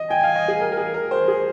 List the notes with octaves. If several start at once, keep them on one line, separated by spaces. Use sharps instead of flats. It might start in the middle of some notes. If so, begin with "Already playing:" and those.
Already playing: D#5
G5 G#5
F5
D#5
G#4
A#4
A#4
G#4
A#4
C5
G#4